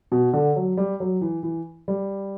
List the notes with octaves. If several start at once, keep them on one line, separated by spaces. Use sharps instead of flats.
B2
D3
F#3
G3
F#3
E3
E3
G3